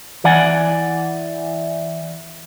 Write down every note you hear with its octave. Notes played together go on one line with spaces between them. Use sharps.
E3 D5 F#5 G#5